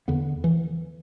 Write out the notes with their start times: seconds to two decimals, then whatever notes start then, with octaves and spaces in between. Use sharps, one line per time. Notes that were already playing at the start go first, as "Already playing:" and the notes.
0.08 E2 D3 B3
0.44 E3